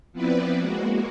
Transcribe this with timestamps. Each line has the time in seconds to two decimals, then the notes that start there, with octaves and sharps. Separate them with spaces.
0.13 F3 B3 C4 E4 B4 D5
0.58 G#3 A#3 F#4